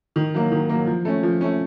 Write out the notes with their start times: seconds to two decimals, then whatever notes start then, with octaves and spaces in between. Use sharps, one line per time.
0.16 D#3
0.34 F#3 A#3
0.52 D#3
0.69 F#3 A#3
0.87 F3
1.05 A3 C#4
1.23 F3
1.41 A3 C#4